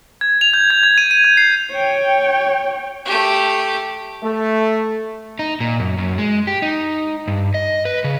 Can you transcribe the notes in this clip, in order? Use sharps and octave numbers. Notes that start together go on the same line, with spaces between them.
G#6
F7
G6
G#6
G#6
D#7
D#7
G6
C7
C#5 G5
A3 G4
A3
D#4
A#2
F#2
F#2
G#3
G4
D#4
G2
D#5
B4
C#3